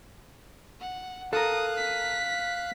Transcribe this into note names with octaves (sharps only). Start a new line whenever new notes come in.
F#5
A4 A#4 F5 D#6 F#6
B6